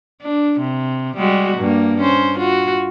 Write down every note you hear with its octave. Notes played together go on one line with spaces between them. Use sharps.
D4
C3
G3 G#3 F#4
G2 A#3
C#4 C5
F4 F#4